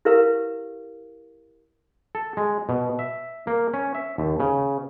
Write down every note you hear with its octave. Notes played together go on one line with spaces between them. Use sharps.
E4 G4 A#4 B4 F5
A4
G#3
B2
E5
A#3
C#4
E5
D#2
C#3